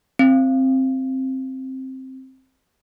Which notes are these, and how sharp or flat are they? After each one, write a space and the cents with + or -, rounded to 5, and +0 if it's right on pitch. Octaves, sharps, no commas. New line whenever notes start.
C4 +10